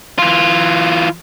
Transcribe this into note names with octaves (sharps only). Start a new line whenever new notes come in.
E3 F4